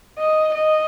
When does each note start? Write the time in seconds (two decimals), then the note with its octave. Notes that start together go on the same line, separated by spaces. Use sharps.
0.18 D#5
0.55 D#5